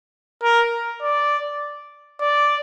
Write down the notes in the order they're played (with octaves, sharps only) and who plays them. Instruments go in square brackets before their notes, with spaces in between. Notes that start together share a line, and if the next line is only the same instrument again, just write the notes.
[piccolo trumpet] A#4
D5
D5